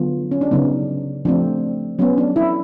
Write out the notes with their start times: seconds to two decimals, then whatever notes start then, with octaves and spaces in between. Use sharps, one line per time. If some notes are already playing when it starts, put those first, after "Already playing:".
Already playing: D3 F#3 B3 F4
0.32 C#4
0.41 D4
0.51 C#3 F#3 B3 D#4
1.25 F3 A3 C4 D4
1.99 F#3 B3 C#4
2.18 D4
2.36 E4